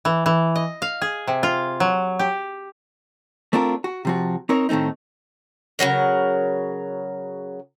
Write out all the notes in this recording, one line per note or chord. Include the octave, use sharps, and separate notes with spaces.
E3
E3
D#5
F5
G#4
C3
F4
F#3
G4
A3 C4 D4 F4 A#4
F#4
C3 F3 F#4
C4 D#4 A#4 C#5
A2 D#3 A3 C4 D#4
C#3 F3 F#3 A#4